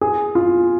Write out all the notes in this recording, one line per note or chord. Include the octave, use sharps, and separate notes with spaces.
G#4
F4